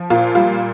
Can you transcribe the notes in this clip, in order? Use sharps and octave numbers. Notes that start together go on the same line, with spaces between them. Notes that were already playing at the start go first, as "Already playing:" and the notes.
Already playing: F3
A#2 F4
G3 F4